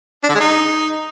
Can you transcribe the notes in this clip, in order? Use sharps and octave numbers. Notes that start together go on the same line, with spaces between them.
D4
D3
G#3
D#4